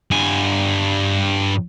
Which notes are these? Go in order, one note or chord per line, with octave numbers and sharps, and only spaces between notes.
G2 G#5